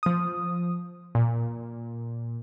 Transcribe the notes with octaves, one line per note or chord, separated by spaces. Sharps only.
F3 D#6
A#2